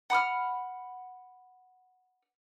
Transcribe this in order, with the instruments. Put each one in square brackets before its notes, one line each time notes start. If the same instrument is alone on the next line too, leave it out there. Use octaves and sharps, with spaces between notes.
[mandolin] F#5 B5 D#6 F6